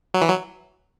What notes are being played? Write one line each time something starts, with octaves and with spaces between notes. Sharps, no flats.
F#3
E3
F#3